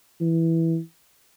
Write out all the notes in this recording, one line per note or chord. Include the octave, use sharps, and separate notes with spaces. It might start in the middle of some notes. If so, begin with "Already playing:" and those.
E3